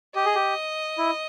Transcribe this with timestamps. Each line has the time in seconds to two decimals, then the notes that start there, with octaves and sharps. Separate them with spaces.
0.15 G4 D#5
0.25 G#4
0.35 G4
0.98 E4